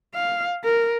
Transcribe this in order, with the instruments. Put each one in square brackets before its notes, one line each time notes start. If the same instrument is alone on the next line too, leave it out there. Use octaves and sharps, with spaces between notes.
[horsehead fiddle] F5
A#4